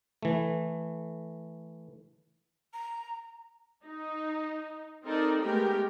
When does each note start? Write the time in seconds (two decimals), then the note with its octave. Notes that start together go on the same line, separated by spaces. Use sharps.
0.23 E3 A3
2.73 A#5
3.84 D#4
5.04 C4 D#4 A4 A#4 D5
5.39 G#3 A3 B3 G4 A#4 G5